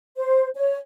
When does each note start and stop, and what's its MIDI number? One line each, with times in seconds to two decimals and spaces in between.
0.16 0.48 72
0.55 0.76 73